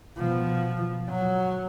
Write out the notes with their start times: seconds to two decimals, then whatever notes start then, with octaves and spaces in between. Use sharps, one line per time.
0.18 B2 F3
1.09 F#3